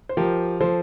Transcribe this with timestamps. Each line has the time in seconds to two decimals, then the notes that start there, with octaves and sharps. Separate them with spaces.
0.09 C5
0.17 F3 G4 A#4
0.60 F3 A4 C5